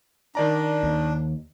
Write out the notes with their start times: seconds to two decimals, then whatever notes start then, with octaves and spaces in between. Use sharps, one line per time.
0.35 D#3 D4 D5 A#5
0.83 D#2